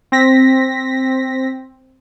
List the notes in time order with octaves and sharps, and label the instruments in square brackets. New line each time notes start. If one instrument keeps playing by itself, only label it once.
[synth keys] C4 A#6 B6